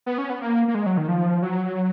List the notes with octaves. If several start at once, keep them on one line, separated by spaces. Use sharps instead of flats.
B3
C#4
B3
A#3
A#3
G#3
F#3
D#3
F3
F#3